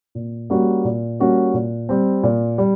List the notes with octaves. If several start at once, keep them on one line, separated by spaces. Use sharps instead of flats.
A#2
G3 A#3 C#4 F#4
A#2
G3 A#3 C#4 F#4
A#2
G3 C4
A#2
G3